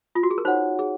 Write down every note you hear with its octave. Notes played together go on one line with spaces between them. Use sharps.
F4
F#4
G#4
A#4
D#4 F#4 C5 C#5 F#5
G#4